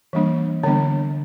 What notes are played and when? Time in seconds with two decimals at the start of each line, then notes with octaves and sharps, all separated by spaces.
0.13 E3 G3 A#3 D4
0.63 D3 G3 B3 D4 C#5